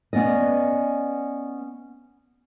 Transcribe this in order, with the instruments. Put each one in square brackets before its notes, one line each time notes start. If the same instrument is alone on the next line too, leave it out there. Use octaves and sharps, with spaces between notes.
[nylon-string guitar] B3 C#4 D5 D#5